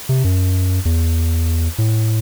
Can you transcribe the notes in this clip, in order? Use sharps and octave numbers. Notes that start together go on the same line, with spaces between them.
C3
F#2
E2
A2